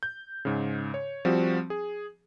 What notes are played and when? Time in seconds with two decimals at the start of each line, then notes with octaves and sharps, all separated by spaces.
0.03 G6
0.45 G#2 C#3
0.94 C#5
1.25 F3 G3 C4 F#4
1.70 G#4